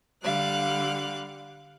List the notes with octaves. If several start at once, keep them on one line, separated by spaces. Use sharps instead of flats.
D3 G3 F5 F#6